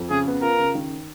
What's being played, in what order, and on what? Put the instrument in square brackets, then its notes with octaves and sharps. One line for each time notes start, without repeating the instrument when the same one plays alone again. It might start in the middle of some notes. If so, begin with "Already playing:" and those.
Already playing: [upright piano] F2
[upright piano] C#3 [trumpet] G#4
[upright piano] B3
[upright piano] F4 [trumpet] A#4
[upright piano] C#3
D#3